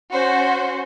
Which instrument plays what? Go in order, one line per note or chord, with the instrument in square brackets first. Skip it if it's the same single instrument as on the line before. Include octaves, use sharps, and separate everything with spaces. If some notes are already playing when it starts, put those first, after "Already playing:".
[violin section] C#4 F#4 C5